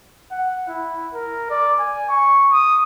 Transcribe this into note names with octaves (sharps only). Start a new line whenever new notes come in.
F#5
E4
A#4
D5
G#5
C#6
D#6